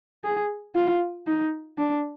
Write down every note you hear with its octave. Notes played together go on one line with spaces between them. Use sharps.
G#4
F4
D#4
D4